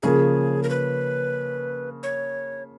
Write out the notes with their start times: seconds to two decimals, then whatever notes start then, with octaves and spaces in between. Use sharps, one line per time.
0.03 C#3 F3 A#3 G#4
0.63 A#4
0.69 B4
2.03 C#5